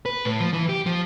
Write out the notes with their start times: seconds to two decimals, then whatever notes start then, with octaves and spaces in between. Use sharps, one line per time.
0.06 B4
0.25 A2
0.40 F3
0.53 E3
0.69 G4
0.86 F3